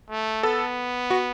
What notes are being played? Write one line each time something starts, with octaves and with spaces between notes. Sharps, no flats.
A3
B3 A4
F#4